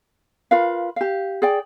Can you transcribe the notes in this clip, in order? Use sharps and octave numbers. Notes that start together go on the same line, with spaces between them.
F4 A#4 B4 F5
G4 F5
G#4 D5 G5